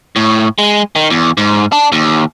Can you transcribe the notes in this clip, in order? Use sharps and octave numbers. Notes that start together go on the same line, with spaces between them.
A2
G#3
D#3
E2
G#2
D4
D#2